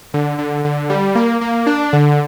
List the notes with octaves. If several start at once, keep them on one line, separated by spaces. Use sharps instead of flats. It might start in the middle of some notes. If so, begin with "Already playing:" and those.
D3
D3
D3
G3
A#3
A#3
D4
D3